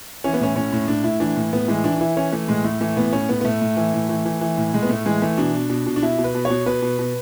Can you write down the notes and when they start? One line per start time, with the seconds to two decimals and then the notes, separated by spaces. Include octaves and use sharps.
0.24 E3 C#4
0.33 B3
0.40 A2 C#4
0.56 A2 C#4
0.73 A2
0.88 A2 D4
1.04 A2 E4
1.20 E3 D4
1.37 A2
1.53 A2 B3
1.68 E3 G#3
1.84 E3 D4
1.96 D4
2.01 E3 E4
2.16 E3 C#4
2.32 E3 A3
2.48 A2 G#3
2.64 A2 A3
2.81 E3 A3
2.97 A2 B3
3.13 A2 C#4
3.29 A2 B3
3.41 B3
3.45 A2 A3
3.62 A2
3.77 E3
3.94 A2
4.09 E3
4.25 E3
4.41 E3
4.57 A2
4.74 A2 G#3
4.82 B3
4.89 A2 A3
5.06 E3 G#3
5.22 E3 A3
5.38 B2 D4
5.54 B2
5.70 B2
5.86 B2
5.96 D4
6.02 B2 E4
6.18 B2
6.24 B4
6.35 B2
6.45 C#5
6.50 B2
6.66 B2 B4
6.82 B2
6.99 B2